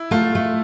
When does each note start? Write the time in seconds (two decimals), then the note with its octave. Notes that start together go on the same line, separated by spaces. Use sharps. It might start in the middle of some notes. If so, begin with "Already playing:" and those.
Already playing: E4
0.11 A3 F4
0.35 A3